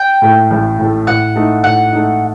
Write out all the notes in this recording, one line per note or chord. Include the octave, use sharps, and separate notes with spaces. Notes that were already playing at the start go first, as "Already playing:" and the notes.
Already playing: G5
A2 A3
A1
A2 A3
A2 F#5
A3 D#4
A2 F#5
A3 D#4